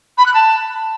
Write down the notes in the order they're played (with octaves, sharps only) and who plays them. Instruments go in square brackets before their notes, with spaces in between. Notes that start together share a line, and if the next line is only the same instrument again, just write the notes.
[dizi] B5
F#6
A5